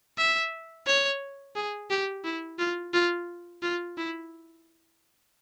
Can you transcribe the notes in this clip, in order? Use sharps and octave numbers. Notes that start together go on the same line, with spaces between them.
E5
C#5
G#4
G4
E4
F4
F4
F4
E4